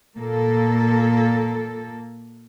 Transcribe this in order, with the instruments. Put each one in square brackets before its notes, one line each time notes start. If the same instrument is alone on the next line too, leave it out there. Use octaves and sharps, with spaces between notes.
[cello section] A#2 A#3 A4